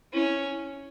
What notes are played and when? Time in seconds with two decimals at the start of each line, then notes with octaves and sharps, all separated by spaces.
0.13 C#4 E4